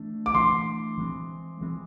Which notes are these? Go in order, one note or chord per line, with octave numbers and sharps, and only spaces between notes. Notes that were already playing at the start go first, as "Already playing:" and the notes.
Already playing: E3 A3 D4
D6
E3 A3 D4 C6
E3 G#3 C4
E3 G#3 C4